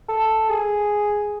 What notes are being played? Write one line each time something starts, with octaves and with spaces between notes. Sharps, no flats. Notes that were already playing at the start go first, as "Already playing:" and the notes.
A4
G#4